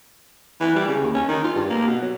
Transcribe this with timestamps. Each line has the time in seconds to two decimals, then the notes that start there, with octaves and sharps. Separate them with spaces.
0.60 E3
0.76 G3
0.88 C#3
1.02 D#2
1.14 C#4
1.28 D#3
1.44 F4
1.55 G2
1.70 A#3
1.87 B2
2.02 F#3